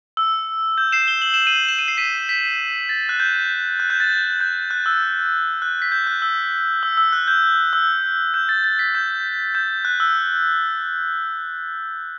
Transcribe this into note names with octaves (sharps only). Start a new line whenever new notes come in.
E6
G6
C7 E7
G7
F#7
E7
D#7 F#7
E7
D#7
C7
B6 D#7
B6
A6
F#6
G6
F#6
G6
A6
G6
F#6
E6
F#6
B6
G6
F#6
E6
E6
E6
F#6
G6
E6
G6
A6
A6
B6
G6
G6
F#6
E6